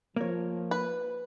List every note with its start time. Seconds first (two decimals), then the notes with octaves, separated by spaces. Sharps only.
0.16 F3 A#3 C#5
0.71 B4